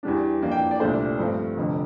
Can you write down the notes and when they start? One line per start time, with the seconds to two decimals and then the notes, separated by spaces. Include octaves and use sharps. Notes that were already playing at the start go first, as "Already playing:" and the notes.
0.03 E2 E3 G3 D4
0.42 F2 E3 A#3 D4
0.51 G5
0.71 D5
0.80 C2 A#2 A3 D4 C5
1.19 G2 F3 A3 C4
1.57 F1 F2 D3